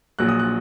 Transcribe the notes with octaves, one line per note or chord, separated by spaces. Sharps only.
A#1 A#2 F#3 F#6
D#6
F#6